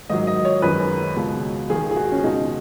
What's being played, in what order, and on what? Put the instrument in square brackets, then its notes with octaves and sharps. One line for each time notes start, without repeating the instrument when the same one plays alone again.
[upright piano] G#2 D#3 F#3 D#5
D#5
C#5
F#2 D#3 G#3 B4
C#2 B2 G#3
D#2 D#3 G#3 G#4
G#4
F#4
C#4
C#2 B2 G#3 D#4